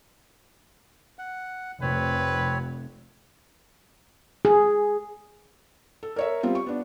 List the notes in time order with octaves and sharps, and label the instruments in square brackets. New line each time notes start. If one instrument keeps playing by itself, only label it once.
[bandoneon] F#5
[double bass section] F1 [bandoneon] C4 C#5 [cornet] B4
[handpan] G#4
[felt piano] A4
A#4 C#5 E5
G3 C4 F4
C#6
B3 D4